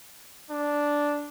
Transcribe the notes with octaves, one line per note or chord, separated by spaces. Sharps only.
D4